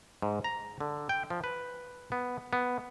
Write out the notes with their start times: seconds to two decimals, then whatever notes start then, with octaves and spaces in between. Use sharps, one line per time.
0.22 G#2
0.44 A#5
0.80 D3
1.09 G5
1.30 F3
1.44 B4
2.12 B3
2.53 B3